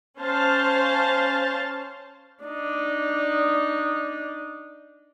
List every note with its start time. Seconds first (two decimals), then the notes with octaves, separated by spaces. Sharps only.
0.20 C#4 C5 F5 A5
2.44 D4 D#4